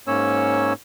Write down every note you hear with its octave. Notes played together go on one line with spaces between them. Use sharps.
G#2 A#3 C#4 C#5 E6